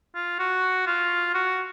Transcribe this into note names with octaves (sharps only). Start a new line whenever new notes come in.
F4
F#4
F4
F#4